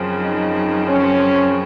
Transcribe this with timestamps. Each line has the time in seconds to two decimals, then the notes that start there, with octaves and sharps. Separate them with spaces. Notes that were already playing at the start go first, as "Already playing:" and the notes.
Already playing: F#2 C#3 F3 C4
0.19 D#4
0.87 C#4